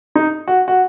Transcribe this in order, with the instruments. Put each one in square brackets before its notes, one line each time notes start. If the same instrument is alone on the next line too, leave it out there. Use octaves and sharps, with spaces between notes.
[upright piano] D#4
F#4
F#4